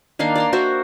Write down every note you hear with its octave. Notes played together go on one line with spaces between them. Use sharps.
D#3 A#3 D4 F5
D5 A#5 C6
A#3 F#4 C5 E5